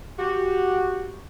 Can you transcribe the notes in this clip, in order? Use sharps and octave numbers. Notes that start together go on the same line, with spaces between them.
F#4 G4